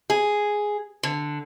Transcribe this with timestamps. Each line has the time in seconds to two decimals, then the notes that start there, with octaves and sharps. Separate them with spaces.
0.10 G#4
1.03 D3